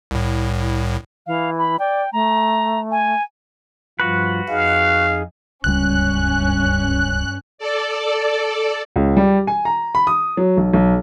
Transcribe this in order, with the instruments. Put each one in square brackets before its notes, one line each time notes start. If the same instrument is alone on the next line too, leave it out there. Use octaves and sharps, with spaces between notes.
[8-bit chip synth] C2 A2
[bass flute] E3 [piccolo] F5
[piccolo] B5
[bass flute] D5 [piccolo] G5
[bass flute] A3 [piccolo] A#5
[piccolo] G#5
[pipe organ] G2 F3 F4 [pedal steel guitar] F#4 B4
[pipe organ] F2 D#4 G#4 [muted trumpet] F5
[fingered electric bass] D1 C#2 G3 [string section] G2 C#4 [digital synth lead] F#6
[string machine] A4 D5
[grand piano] C#2
G3
G#5
A#5
B5
D#6
F#3
B1
B1